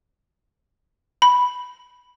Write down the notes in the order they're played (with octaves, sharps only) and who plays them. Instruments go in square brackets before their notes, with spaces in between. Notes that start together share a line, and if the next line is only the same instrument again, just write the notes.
[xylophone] B5